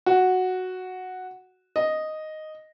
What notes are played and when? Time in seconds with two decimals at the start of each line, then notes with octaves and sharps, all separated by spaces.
0.06 F#4
1.76 D#5